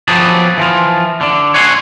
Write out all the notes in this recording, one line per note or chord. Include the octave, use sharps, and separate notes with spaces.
F3 F#3 B3 G4 G#4 A5
E3 F3 F4
D3 D4
C#5 F#5 G#5 C6